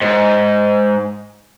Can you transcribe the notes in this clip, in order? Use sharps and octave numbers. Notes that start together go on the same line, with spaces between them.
G#2